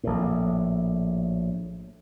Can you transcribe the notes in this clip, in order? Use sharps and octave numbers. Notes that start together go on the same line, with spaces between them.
A#1 A2